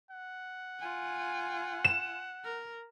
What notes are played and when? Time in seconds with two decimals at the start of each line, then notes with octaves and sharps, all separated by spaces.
0.11 F#5
0.79 F4 G#5
1.85 E7
2.44 A#4